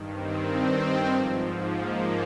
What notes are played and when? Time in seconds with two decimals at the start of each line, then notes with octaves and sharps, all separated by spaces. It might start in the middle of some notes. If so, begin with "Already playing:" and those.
Already playing: G2 D#3
0.11 C4
1.10 G#2 F3
1.76 A#3